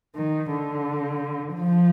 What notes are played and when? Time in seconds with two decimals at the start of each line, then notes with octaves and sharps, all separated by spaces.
0.16 D#3
0.51 D3
1.54 F3